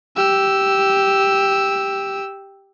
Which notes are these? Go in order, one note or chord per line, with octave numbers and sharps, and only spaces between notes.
G4 E6